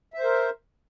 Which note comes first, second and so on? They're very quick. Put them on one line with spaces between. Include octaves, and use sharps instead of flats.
E5 C5 A#4